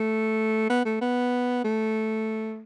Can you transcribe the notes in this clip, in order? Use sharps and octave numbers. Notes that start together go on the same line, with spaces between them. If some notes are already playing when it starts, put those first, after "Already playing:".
Already playing: A3
B3
A3
B3
A3